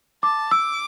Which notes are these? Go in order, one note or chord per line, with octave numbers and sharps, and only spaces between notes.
A5 D6
D6 E6